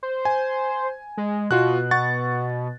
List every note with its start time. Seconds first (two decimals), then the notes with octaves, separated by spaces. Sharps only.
0.03 C5
0.25 G#5
1.17 G#3
1.51 B2 F4 F#4 F#6
1.91 F#5 C#6 A6